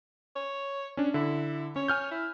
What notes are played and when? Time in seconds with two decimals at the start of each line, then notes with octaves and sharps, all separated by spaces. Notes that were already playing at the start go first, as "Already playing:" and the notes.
0.36 C#5
0.97 C#4 D4
1.14 D3 E4
1.76 C#4 C#5
1.88 G#5 F6 G6
2.11 E4